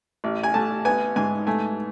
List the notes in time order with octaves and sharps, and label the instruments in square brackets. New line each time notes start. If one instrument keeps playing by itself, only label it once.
[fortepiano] A1
G#5
A3 A5
B3 G#5
G#2 G#5
A3 G#5